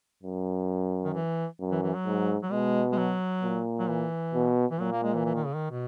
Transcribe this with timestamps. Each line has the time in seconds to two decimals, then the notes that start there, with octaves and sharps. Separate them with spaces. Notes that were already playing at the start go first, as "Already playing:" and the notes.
0.23 F#2
1.05 D#3
1.14 E3
1.61 F#2
1.71 E3
1.83 E3
1.94 F#3
2.06 G#2
2.43 F#3
2.51 B2 G#3
2.92 G#3
2.97 F#3
3.43 A#2
3.79 F#3
3.89 E3
4.34 B2
4.71 E3
4.80 A#2 F#3
4.92 A#3
5.03 G#3
5.14 E3
5.25 E3
5.35 D#3
5.46 C#3
5.55 D#3
5.71 B2